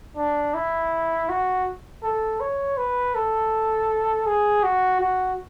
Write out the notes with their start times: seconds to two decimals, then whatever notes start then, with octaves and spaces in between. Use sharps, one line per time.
0.17 D4
0.54 E4
1.29 F#4
2.03 A4
2.40 C#5
2.78 B4
3.15 A4
4.26 G#4
4.63 F#4
5.01 F#4